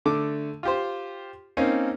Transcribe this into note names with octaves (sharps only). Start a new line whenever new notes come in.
D3 A3 D6
F4 G4 C5
A#3 C4 C#4 D#4